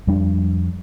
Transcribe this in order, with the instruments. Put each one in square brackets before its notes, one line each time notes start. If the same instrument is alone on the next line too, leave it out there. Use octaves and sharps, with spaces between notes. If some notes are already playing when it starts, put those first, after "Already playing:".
[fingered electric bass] F2 G3 D4